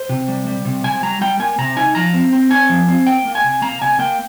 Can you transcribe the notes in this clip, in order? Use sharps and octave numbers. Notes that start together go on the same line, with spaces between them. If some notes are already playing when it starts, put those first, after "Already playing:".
Already playing: C5
C3
G3
G3
C3
C3 G#5
G3 A#5
G3 G5
A#3 G#5
C3 A#5
D#4 G#5
F3 A#5
C4
C4
C4 G#5
F3
C4
A#3 G5
A#3
G#5
C3
A#3 A#5
C3 G#5
A#3 G5